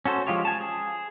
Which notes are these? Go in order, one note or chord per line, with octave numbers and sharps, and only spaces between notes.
C#4 F#4 A4 C5
F3 G#3 F4 G4 C#5
G#5 A5
G#4